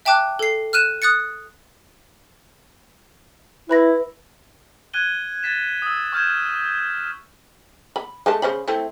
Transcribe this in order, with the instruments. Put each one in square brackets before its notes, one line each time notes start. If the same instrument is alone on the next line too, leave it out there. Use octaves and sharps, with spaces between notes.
[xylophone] E5 G5 A5 D6 F#6
A4 C7
F6 F#6 D#7 E7
D#6 F#6 A6 C#7
[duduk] E4 [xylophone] B4 B5 A#6
[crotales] F#6 G#6 D#7 G7
G#6 A6 B6 E7
D#6 E6
C#6 F6 G6 G#6 E7
[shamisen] B5
G#3 A3 A5
C#3 C5 B5
A3 C4 E4